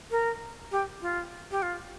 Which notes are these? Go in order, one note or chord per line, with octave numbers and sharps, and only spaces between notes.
A#4
G4
F4
G4
F4